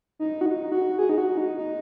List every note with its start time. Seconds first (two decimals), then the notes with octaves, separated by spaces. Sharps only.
0.19 D#4
0.41 F#4
0.46 D#4
0.72 F#4
0.99 G#4
1.09 D#4
1.18 F#4
1.37 D#4
1.57 D#4